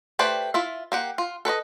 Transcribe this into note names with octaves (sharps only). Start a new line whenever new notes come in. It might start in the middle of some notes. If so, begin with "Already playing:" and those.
A3 G4 B4 C5 D5
E4 F4 E5
A#3 G4 F#5
F4
A4 B4 C#5 D#5